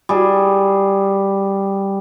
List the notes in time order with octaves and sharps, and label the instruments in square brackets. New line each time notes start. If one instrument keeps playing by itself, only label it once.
[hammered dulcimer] G3 G#4